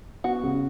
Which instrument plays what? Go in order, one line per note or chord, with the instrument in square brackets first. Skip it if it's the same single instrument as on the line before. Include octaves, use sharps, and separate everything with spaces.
[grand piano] B3 [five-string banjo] F#4
[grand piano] C#3